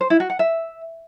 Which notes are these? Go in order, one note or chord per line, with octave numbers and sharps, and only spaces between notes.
C5
E4
F#4
F#5
E5